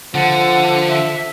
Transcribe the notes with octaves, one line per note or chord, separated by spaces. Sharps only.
D3 F3 F#5
E5